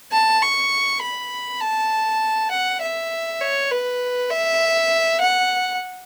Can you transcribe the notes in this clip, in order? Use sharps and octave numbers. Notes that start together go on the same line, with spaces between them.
A5
C#6
B5
A5
F#5
E5
C#5
B4
E5
F#5